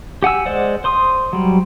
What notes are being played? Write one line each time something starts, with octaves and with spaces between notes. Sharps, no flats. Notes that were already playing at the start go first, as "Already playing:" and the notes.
G4 F#5 G#5 E6
G#3 C5 D5 F#5
C5 C6 D#6
F#3 G3